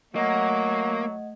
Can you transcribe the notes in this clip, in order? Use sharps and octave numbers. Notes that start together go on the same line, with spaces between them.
F#3 A3 A#3 D#5 F#5 G#6